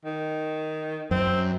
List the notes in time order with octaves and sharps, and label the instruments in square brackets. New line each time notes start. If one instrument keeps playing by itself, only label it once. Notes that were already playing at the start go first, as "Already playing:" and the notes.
[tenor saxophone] D#3
[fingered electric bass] F#2 [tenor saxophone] C4